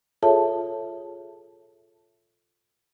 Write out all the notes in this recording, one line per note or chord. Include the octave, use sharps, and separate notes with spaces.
F4 G#4 A4 C#5 E5 A5